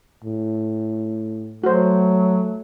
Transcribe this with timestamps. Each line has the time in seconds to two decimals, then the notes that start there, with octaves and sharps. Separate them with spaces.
0.24 A2
1.64 F#3 A3 F#4 C5